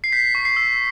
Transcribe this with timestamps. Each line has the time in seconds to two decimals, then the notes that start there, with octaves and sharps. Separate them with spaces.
0.04 C7
0.12 G6 B6
0.35 C#6
0.45 C7
0.56 E6